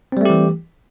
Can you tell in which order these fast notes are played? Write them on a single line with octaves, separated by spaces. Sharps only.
C4 G3 A3 G4 E3